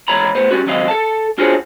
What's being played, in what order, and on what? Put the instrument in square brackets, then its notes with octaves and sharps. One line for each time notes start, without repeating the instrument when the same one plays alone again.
[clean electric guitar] G#2 E3 C#5 A#5 B5
A2 B3 C5
G3 C#4 F#4
C#2 D#3 F#3 C4 D#5 F5
A4 A5
D4 F4 F#4 G#4 C5 C#5